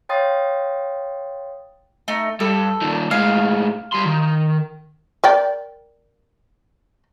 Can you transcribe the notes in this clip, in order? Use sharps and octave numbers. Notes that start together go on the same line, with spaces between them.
C#5 F5 G5 C6 D#6 A6
A3 D#4
G2 A4
A#2 D#3
A2 G#3 F5
G3 C6
D#3
A#4 D5 G5